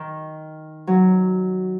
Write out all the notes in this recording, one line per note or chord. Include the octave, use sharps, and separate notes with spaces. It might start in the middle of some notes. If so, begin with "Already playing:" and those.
Already playing: D#3
F#3